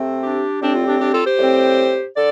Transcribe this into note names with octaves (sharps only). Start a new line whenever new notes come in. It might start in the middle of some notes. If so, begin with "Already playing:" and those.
Already playing: C3 A3 C4
D4 G4
A2 G3 C4 D4 G4
F4
D4 G4
D4 G4
F4 A4
G4 C5
A2 G3 C4
D3 A4 D5